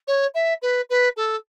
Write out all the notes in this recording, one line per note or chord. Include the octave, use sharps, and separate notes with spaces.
C#5
E5
B4
B4
A4